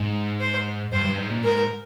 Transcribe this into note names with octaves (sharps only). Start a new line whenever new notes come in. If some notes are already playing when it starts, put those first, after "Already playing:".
Already playing: G#2
C5
G2 C5
G2
G#2
A#2
G#2 A#4